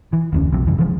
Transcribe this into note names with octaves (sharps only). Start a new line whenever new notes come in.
E3
F1 D2 C#4
B1 C3 F3
F#2 C#3 E3
F1 E3 F3 G#3